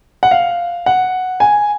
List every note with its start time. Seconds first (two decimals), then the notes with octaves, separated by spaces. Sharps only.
0.23 F#5
0.31 F5
0.86 F#5
1.40 G#5